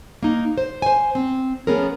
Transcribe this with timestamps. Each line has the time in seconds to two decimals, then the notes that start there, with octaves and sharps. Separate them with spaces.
0.23 A#3 D#4
0.58 C5
0.82 C5 G#5
1.15 C4
1.67 F3 A3 B3 C#4 G#4 A#4